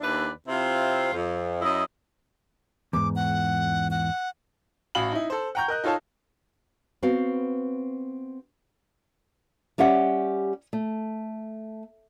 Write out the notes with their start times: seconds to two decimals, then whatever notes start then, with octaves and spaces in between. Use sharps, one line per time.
0.01 D#2 D4 E4 B4 D5
0.48 C3 C4 E4 F4
1.14 F2
1.62 F#2 E4 D#5
2.93 E2 G#2 D6
3.16 F#5
3.91 F#5
4.95 A1 F#4 F5 B5 F#7
5.12 D#4 E4
5.30 A4 C5
5.55 F#5 G5 A#5 C#6 G6
5.68 A#4 D#5 F#6
5.84 D#4 F4 A4 C#5 F5 A5
7.03 B3 C4 F#4 F5
9.78 G3 C#4 G4 E5 F#5
10.73 A3